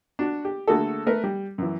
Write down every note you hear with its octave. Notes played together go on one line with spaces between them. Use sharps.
D4 F#4
G4
D3 A3 A#3 F#4 G#4 A4
A3 A#4 B4
G3
F#2 E3